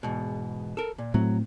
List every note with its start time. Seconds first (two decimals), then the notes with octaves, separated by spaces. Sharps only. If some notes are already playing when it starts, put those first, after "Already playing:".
0.03 E2 G#2 B2
0.77 A4 A#4
0.98 A#2
1.14 A2 F#3 A3 C4